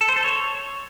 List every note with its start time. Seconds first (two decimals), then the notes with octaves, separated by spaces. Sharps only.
0.01 A4
0.09 C5
0.16 A4
0.24 C#5